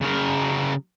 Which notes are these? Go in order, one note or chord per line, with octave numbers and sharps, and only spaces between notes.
C#3 A#4